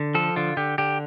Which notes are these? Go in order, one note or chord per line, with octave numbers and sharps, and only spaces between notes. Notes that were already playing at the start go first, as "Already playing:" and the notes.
Already playing: D3
F3 A4
D3 F4
D3 G4
D3 G4